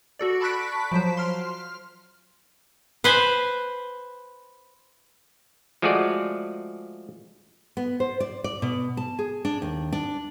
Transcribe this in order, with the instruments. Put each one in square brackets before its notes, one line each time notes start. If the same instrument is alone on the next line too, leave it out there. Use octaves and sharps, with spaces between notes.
[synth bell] F#4 A4 D5
A5 B5 C#6 F#6 B6 D7
F3 F#3 C5
C6 F6
[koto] B4 C5 G#5
[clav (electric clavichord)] F3 G#3 A3 F#4 G#4 D5
[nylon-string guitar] B3
C5
D5
D5
B2
A5
G#4
D4
D#2
D4